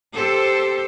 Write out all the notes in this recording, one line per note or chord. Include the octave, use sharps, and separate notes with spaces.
G4 A4 C5